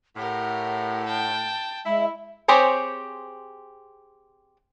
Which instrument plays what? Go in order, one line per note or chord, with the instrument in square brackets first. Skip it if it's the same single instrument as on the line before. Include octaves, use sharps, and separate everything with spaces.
[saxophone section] A2 [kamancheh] G4 A#4 [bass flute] F#5
[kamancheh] G5 A5
[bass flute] G#3 [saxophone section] E4 [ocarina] E5
[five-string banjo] C4 G4 G#4 C5 C#5